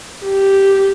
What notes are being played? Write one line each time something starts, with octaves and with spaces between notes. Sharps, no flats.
G4